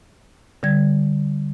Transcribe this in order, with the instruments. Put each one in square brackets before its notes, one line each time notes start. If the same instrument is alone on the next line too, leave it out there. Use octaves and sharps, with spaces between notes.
[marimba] D3 G3 G#6